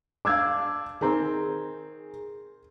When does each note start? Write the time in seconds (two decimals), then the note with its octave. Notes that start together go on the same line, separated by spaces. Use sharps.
0.25 D4 F5 D6 E6 G#6
1.01 D#3 C4 G#4 A#5